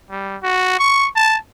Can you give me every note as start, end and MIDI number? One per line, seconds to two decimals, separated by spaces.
0.11 0.37 55
0.43 0.77 66
0.79 1.09 85
1.16 1.38 81